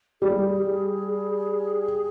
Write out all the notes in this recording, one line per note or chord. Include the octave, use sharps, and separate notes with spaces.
G3 G#4